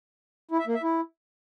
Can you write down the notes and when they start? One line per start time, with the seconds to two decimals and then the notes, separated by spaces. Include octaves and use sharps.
0.51 E4
0.59 E5
0.67 A#3
0.75 E5
0.83 E4